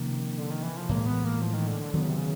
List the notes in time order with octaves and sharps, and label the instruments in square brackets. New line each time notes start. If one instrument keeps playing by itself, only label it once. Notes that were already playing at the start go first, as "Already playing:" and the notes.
Already playing: [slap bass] C3 F3 A#3 C#4 [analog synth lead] D#3
[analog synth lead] D3
D#3
E3
F3
[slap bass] A2 E3 G#3 [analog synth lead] A#3
[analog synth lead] B3
A#3
F3
D#3
D3
D3
[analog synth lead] D3 [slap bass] D#3 F#3 B3
[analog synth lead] C#3
C3
C#3